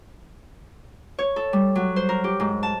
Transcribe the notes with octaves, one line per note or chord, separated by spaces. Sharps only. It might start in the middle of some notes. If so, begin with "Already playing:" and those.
C#5
A4
G3
F#3
C5
A#4
G4
G#2
A5